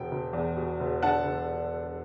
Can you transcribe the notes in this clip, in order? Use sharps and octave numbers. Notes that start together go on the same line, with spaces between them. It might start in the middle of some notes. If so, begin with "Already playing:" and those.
Already playing: E1 B2 G5
E1
E2
B2
E1
D3 F#5 A5
E1